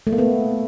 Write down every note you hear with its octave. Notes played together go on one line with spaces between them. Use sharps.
A3
A#3
B3